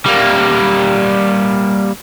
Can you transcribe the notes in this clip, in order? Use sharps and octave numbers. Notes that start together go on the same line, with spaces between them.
G3 A#3